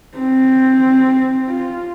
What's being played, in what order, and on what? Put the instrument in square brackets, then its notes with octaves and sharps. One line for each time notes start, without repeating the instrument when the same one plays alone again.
[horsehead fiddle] C4
F4